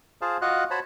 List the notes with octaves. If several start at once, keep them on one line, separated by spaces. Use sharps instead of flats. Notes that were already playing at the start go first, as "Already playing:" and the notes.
F4 G#4 C5 F5 A5
F4 F#4 D#5 F5 F#5 F#6
F#4 C5 C#5 A5 B5